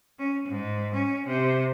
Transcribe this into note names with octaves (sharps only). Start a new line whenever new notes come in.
C#4
G#2
C#4
C3